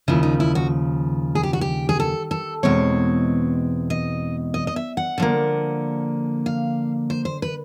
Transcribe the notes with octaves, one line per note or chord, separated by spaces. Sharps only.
D#2 C#3 F3 E4
D#4
E4
F#4
G#4
G4
F#4
G4
G#4
A4
A4
E2 B2 G#3 C4 C#5
D#5
D#5
D#5
E5
F#5
D3 F3 A#3
F5
C5
C5
B4